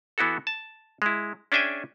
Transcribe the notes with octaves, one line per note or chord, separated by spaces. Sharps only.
E3 B3 E4 F#4 A4
A5
G#3 E4
C#4 D4 G#4 E5 G5 G#5